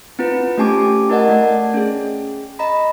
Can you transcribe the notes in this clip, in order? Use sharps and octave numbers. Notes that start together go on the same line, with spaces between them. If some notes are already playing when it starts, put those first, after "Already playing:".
C4 E4 F4 B4
A3 C#4 G4 G#5 A5 D6
E4 A#4 D5 D#5 F#5 A5
A3 D5
C#4 G#4
D#5 A#5 B5